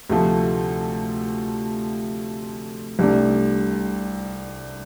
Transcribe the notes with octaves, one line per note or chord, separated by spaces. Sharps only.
D2 C3 F3 A3
C2 C3 A3 D4